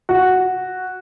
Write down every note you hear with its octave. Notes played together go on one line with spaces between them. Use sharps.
F#4